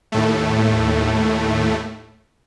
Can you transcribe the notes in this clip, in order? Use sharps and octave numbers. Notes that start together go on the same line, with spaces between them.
D#2 A2 A3